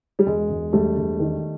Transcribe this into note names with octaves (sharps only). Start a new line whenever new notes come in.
G3
E1 G#3
E1
E1 G3 A3
E1
D#3